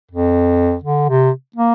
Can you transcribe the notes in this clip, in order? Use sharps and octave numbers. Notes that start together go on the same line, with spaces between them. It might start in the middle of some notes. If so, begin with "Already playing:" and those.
F2
D3
C3
A#3